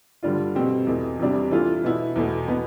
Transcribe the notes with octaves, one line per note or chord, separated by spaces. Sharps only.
G2 D3 G3 D4 F4
B2 A3 C4 G4
E2 B2 A3
E2 C3 E3 G3 D4
E3 A3 D4 F4
B2 B3 E4
E2 B2 A3
B2 B3